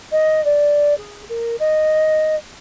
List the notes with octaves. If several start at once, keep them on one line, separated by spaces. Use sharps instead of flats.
D#5
D5
G#4
A#4
D#5